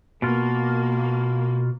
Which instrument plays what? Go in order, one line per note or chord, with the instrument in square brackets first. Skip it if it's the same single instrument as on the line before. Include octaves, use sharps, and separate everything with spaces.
[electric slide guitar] B2 F4 [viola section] A#3